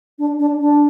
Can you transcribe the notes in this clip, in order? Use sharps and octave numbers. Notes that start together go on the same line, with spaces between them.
D4
D4
D4